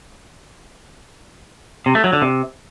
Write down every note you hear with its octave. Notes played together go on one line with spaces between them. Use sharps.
C3
A3
F#3
D3
C3